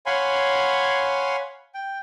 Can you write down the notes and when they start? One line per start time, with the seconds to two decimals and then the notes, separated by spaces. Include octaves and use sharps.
0.06 C#5 F5 F#5 G#5 B5 C6
1.75 G5